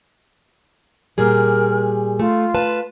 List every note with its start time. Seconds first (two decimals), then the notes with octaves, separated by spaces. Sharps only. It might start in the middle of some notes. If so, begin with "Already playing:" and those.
1.18 A#2 G3 G#4 A#4
2.19 A3 F4
2.54 B4 A5